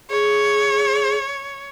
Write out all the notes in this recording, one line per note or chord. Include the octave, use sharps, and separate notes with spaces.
G#4 C#5